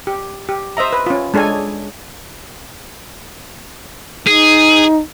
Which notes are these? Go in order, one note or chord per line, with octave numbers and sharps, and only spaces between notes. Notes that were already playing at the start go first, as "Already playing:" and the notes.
G4
G4
C5 D#5 E5 A#5
B4
C#4 F4
G#3 D4 A4 C#5 G#5
D#4 G#4